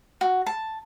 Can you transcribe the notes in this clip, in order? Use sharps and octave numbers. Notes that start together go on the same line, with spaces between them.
F#4
A5